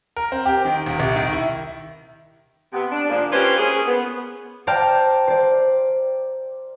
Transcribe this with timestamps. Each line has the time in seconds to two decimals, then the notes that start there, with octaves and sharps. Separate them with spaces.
0.16 A#4
0.32 C4
0.46 G4
0.65 D#3
0.86 D#1
1.00 C2
1.16 D#3
1.33 E4
2.73 C3 B3
2.92 D4
3.09 G#2 D3 F3 A#3 D4
3.31 C#4 F4 G4 B4 C5
3.58 A#3 C#4 G#4
3.86 B3
4.67 C5 D5 G5 A5 A#5 F6
5.28 C5 D5